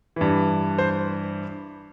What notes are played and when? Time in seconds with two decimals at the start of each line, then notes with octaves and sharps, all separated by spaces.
0.16 G2 E3
0.78 C5